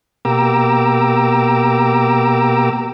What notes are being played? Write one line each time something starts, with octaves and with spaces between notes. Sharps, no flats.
B2 A#3 G4 A#5 D6 E6